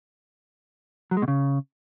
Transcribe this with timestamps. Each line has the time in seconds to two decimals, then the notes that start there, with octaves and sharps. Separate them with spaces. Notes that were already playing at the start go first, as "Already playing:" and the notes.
1.11 F#3
1.17 G#3
1.22 B2
1.28 C#3